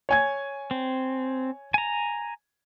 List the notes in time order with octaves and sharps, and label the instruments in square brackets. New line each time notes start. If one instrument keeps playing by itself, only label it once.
[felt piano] C#5 G#5 G#6
[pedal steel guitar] C4
G#5 A#5